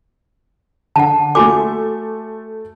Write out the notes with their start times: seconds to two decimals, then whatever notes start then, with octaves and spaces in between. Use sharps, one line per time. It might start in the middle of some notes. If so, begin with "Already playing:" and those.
0.96 D3 F#5 A5
1.35 A3 F#4 A4 G#5 D6